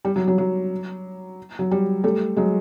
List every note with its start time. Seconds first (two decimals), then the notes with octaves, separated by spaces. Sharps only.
0.05 G3
0.16 F#3
0.28 F#3
0.38 F#3
1.59 F#3
1.71 G3
2.04 G3 A3
2.37 F#3 G#3